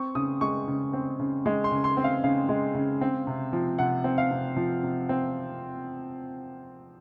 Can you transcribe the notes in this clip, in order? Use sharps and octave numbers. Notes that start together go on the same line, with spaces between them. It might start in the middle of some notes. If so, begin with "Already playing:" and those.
Already playing: C4 C#6
C#3 D#6
G#3 C#6
C#3
C4
C#3
G#3
C6
C#3
C6
C4
F5
C#3 F5
G#3
C#3
C4
C3
F3
C3 F#5
C4
F5
C3
F3
C3
C4